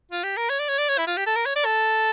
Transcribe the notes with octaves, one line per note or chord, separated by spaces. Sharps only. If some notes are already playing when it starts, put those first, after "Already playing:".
F4
G4
A#4
C#5
D5
C#5
D5
C#5
E4
F4
G4
A4
A#4
C#5
D5
A4